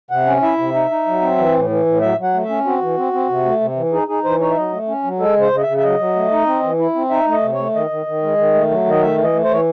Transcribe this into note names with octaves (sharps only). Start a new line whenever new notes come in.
C3 F#5
C#4
E4 E5
C3
D#4
D#4
F#3
C4
E3
A2
E3
A2
F#3 E5
F#3
F#5
A3
E5
C#4
C4 F#4
E3
C4
C4
C3
A3
C3
E3
D#4 G#4
D#4 G#4
E3 C5
D#4 C#5
E5
F#3 D#5
A3
C#4
F#3
G#3 A4
C#3 C5
C#3
D#5
C#3 E5
E5
F#3 D#5
F#3
A3
D#4
C4
E3
E4
C4
D#4 E5
A3
D#5
C3
C#5
A3
D#3 D#5
D#3
D#3
G#3
D#3
A3
F#3
D#3 D#5
A3 E5
E3
D#5
A3
C5
E3 C#5